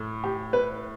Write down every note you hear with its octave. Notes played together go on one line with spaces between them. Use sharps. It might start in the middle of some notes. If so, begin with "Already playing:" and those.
Already playing: A2
G4
B4